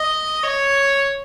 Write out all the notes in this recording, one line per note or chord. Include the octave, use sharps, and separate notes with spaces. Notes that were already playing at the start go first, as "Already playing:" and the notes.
Already playing: D#5
C#5